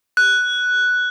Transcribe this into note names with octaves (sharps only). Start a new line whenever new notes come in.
F#6